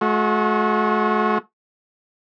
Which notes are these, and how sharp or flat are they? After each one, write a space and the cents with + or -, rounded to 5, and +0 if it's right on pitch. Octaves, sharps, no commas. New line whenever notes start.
A3 -45 F#4 -25